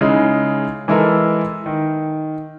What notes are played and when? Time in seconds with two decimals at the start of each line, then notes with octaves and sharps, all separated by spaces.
0.01 C#3 G#3 D#4 E4
0.88 E3 G#3 E4 A4 A#4
1.66 D#3